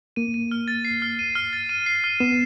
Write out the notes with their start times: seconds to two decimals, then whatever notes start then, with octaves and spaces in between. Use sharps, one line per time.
0.16 A#3 D#7
0.34 D#7
0.51 F6
0.68 A6
0.85 C7
1.02 F6
1.19 D#7
1.35 F6
1.53 A6
1.69 D#7
1.86 C7
2.04 F6
2.20 B3 E7